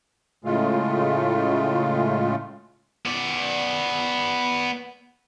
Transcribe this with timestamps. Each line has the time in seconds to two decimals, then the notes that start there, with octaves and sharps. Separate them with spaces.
0.45 A2 C#3 G#3 A3 F4
3.05 B3 D5